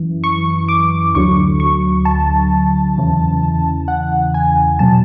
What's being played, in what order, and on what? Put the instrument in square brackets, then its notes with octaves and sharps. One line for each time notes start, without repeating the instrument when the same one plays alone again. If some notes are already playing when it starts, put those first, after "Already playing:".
Already playing: [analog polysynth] F#2 E3
C#6
D6
D2 D3 F#3 C#6
C#6
A5
E2 C#3 E3
F#5
G#5
B2 F#3 A5